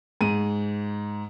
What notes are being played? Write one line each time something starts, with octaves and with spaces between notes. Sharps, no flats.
G#2 D#7